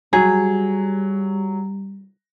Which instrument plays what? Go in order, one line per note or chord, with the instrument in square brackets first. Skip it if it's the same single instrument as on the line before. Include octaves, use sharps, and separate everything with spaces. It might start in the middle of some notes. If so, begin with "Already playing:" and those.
[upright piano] F#3 [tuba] G3 [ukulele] G#4